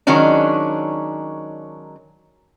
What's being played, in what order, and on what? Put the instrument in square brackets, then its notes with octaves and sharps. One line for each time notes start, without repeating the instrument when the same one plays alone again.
[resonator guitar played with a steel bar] D#3 F#3 G#3 C#4 D4